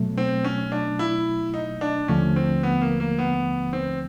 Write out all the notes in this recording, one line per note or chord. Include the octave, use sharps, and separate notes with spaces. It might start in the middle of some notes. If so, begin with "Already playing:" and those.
Already playing: B2 F#3 A3
C4
C#4
D4
E4
D#4
D4
D#2 D3 F3 A3 C#4
C4
B3
A#3
A#3
B3
C4